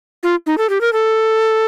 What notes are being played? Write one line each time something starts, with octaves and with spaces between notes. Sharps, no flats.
F4
D#4
A4
G4
A#4
A4